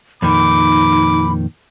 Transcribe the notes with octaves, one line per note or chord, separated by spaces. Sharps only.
F2 A#2 D#3 D#4 B5 D6